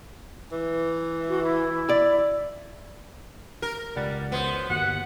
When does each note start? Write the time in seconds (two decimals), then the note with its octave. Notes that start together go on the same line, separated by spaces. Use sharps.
0.52 E3
1.29 F#4
1.44 E4
1.89 D5
3.62 A#4
3.96 C#2 G3 F#5 A6
4.32 F#2 G#3 B3 C5
4.69 G1 D#2 F#4 F#5